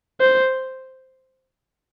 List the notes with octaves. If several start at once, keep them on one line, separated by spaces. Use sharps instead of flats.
C5